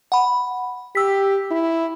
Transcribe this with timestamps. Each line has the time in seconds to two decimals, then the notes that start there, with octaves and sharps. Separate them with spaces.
0.12 F#5 B5
0.95 G4 E6 B6
1.51 E4